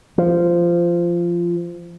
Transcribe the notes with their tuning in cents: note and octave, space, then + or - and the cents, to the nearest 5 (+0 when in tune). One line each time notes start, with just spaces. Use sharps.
F3 -15